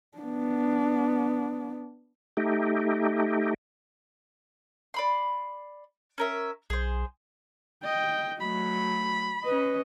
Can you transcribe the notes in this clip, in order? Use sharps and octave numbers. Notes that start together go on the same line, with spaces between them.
B3 D4
A3 D#4 G4
D5 B5 C6
C#4 A#4 E5
B1 G#4 C5
D#5 G5
F#3 A3 B5
C#4 B4 D#5